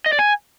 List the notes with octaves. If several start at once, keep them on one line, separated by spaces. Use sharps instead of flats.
D#5
D5
G#5